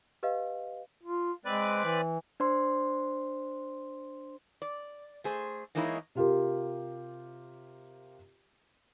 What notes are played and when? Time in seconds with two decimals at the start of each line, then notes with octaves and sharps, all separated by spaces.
0.23 G4 B4 D#5 F5
1.03 F4
1.45 G#3 C4 B4 D5
1.84 E3
2.40 D4 C5 C6
4.62 D5
5.24 A3 G#4 C5
5.75 E3 G#3 A#3 D#4 E4 C#5
6.15 C3 F4 G4 A#4